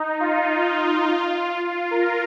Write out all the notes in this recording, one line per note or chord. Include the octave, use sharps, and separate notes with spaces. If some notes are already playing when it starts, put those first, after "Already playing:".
Already playing: D#4
F4
F4
A#4